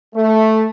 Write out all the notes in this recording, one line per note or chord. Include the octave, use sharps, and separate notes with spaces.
A3